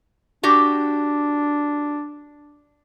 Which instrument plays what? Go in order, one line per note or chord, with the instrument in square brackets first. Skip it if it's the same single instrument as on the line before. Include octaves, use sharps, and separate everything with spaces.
[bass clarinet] D4 [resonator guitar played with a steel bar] F#4 G4